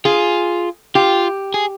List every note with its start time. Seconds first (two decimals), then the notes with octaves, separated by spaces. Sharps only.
0.05 F4 G#4
0.95 F4 G4
1.54 G#4